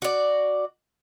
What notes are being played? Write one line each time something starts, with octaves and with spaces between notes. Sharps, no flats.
F#4 D5